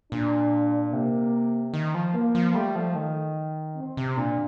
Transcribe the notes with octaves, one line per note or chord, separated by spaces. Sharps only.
A#2 D4
C3 A#3
D#3
F3
A#3
F3
G3 A3
F3
D#3
C4
C3
A#2 D4